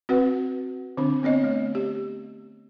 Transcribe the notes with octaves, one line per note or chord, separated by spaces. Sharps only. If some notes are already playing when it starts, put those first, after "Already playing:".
C4 F#4 B4 F#5
D3 C4 D4
B3 C4 C#5 D#5
A3
G4